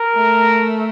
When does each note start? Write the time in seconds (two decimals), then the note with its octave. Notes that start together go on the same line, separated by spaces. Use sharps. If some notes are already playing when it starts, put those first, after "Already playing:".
Already playing: A#4
0.15 A3